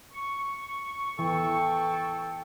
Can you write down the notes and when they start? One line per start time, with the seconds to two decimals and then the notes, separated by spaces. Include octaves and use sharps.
0.14 C#6
1.19 E3 A4 G5